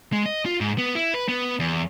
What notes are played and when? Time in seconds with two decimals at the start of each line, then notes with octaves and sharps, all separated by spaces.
0.13 G#3
0.26 D#5
0.46 F4
0.61 G#2
0.78 B3
0.95 E4
1.14 B4
1.28 B3
1.59 E2